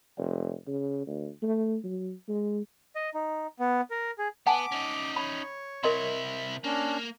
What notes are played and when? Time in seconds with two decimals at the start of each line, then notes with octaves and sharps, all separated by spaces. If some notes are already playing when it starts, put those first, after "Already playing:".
0.17 F1
0.67 C#3
1.07 D2
1.43 A3
1.84 F#3
2.28 G#3
2.95 D#5
3.14 D#4
3.59 B3
3.90 A#4
4.18 G#4
4.47 B3 F#5 G#5 A5 D6
4.72 C#4 D#4
5.16 C#5 B5
5.83 C3 E4 A#4 D#5 C6
6.64 A#3 C#4 D4